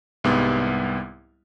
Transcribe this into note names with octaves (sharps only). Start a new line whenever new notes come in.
C2 G#2 G3 B3